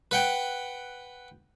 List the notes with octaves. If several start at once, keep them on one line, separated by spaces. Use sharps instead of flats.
B4 F#5 G5